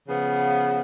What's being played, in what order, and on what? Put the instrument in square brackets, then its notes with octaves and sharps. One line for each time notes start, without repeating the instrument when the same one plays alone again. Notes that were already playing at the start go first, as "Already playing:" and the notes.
[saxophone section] C#3 F3 B3